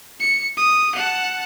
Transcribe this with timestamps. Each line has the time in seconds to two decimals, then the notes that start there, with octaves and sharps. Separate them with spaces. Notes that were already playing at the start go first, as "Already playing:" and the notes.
0.20 C#7
0.57 D#6
0.95 F#5 A5